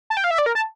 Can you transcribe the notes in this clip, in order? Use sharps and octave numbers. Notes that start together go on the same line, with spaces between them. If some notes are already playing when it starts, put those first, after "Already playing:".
A5
G5
F5
E5
D5
A#4
A5